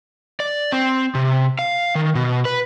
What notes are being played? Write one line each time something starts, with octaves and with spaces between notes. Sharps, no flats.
D5
C4
C3
F5
D#3
B2
B4